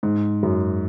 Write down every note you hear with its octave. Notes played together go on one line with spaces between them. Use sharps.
G#2
F#2